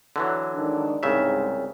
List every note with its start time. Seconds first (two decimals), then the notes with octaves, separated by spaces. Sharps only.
0.16 D3 E3 F#3
0.54 G#2 D#3 D4
1.03 C2 G#2 C#3 E5